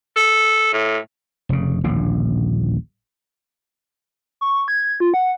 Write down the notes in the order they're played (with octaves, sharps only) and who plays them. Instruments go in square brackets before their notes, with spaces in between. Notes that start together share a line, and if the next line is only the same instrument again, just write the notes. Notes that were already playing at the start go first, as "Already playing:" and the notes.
[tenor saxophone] A4
A2
[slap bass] F1 C#3
D#1 A#1 A2 D3
[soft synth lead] C#6
G#6
F4
F#5